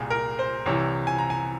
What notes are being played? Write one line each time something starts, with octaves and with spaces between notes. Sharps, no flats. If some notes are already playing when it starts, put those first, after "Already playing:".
Already playing: C2 A#2 G#4
A#4
C5
C2 C3 E3 C#5
G#5
A#5
G#5